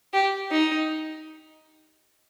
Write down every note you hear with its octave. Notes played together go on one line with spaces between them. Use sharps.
G4
D#4